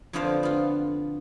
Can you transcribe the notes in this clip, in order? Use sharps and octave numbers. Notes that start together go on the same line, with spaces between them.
F2 D3 B3 F4 C5 F5
B3 F4